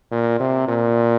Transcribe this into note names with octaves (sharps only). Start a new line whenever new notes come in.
A#2
C3
A#2